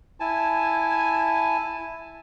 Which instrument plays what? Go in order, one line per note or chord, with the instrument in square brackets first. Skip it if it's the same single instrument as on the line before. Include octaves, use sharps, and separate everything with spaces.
[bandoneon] E4 G#5 A5